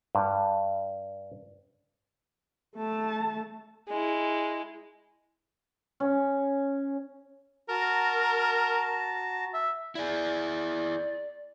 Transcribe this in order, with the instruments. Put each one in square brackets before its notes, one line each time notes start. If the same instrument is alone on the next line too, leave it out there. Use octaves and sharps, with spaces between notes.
[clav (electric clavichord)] G2
[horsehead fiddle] A3 A5
[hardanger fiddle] G#3 E4
[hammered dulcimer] C#4
[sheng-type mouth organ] F#4 A5 A#5 [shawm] A#4
[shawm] E5
[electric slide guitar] E4 G#4 [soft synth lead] D5